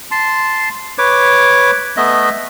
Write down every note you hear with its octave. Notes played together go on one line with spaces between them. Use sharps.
A5 C6
B4 C#5 D6
A3 B3 D#5 E5